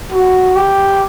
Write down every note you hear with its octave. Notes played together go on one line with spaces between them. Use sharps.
F#4
G4